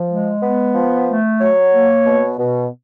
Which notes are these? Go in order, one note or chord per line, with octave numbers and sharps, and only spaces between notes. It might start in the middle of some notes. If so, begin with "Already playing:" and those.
Already playing: F3
G#3
B3
F3
A3
F#3 C#5
A#3
B2
B2